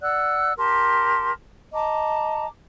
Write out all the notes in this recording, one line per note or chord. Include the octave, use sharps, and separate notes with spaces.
D5 F#5 E6 F#6
G4 A#4 A5 C6
D#5 A5 A#5 D6